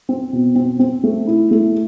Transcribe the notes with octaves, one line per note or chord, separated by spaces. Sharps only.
C4
B2
C4
C4
A3
E4
A3